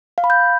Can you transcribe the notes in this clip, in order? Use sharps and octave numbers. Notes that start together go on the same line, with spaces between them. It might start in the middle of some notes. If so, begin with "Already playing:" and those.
F5
B5
G6